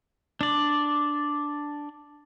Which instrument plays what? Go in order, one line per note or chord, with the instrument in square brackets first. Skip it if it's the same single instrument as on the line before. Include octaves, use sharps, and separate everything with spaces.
[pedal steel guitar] D4 D5